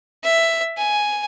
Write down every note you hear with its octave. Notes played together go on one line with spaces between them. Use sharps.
E5
G#5